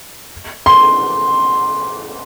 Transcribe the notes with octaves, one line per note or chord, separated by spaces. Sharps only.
C6